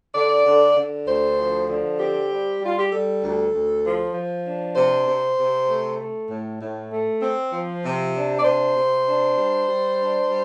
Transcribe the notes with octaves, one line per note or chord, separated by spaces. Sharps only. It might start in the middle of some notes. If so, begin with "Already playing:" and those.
D3 D5
D3
D3
D2 C5
F3
D3
C4 G4
G3
G3 F4
G4
G3 A4
D2
D2
F3
F3
D4
C3 C5
C3
C3
A3
A3
A2
A2
A3
C4
F3
C3
D4
D5
C3 C5
C3
D4
G3
G3
D4
G3